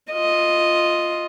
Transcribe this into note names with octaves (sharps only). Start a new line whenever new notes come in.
F4 D#5